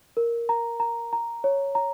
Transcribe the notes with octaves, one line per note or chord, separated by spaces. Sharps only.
A#4
A#5
A#5
A#5
C#5
A#5